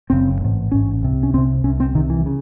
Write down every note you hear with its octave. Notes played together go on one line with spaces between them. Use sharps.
F#1 F#2 C#3 C4
A1 G#2
A1 G#2 C#4
C2 C3
C#4
C2 C3 C4
C2 C3 C#4
C4
C2 C3 D#3
E3
C#3